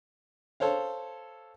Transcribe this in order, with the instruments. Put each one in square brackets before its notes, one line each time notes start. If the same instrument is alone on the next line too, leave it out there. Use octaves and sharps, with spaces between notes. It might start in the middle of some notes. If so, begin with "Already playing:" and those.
[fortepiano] A4 C5 C#5 F5